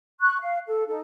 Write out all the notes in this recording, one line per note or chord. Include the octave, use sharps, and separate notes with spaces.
C#6 F#6
F5
A4
D#4 A4